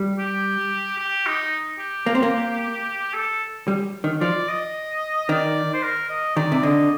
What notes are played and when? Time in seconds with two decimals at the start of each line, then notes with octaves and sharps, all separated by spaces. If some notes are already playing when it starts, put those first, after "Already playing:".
Already playing: G3
0.19 G4
0.99 G4
1.26 D#4
1.79 G4
2.06 A#3
2.15 C4
2.23 A#3
3.14 A4
3.68 G3
4.04 D#3
4.21 F3 D5
4.49 D#5
5.29 D#3 D5
5.74 C5
5.83 A#4
6.09 D#5
6.36 D#3 D5
6.52 C3
6.63 D3 D#5